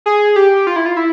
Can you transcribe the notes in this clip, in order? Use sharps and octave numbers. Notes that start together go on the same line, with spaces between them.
G#4
G4
F4
E4
F4
E4